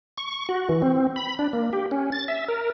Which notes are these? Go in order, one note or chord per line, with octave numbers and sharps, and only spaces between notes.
C#6
F#4
E3
C4
B5
D4
A#3
G4
C#4
A6
E5
A#4